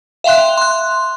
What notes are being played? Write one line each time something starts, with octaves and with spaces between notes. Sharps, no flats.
E5 F5 G5 C6 F#6
C6 F#6